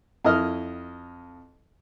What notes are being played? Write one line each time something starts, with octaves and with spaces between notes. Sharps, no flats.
F2 E4 D#5 F6